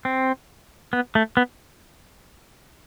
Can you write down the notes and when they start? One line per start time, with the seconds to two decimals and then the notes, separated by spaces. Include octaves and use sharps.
0.05 C4
0.93 B3
1.15 A3
1.37 B3